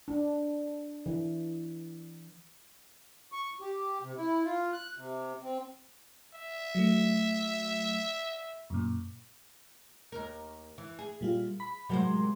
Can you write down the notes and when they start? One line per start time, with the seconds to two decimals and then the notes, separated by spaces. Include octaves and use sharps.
0.08 D4
1.06 E3
3.32 C#6
3.61 G4
4.02 C3
4.18 E4
4.45 F4
4.73 F#6
4.96 C3
5.42 C4
6.34 E5
6.75 F#3 A3
8.70 F#2 A#2
10.12 D#2 A#4
10.78 E3
10.99 G#4
11.21 A#2 G3 F4
11.60 B5
11.89 A2 C3 F#3 G#3 A#4 C5